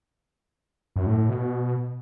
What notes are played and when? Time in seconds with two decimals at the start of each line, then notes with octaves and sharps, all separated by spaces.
0.96 F#2
1.07 A2
1.18 A2
1.29 B2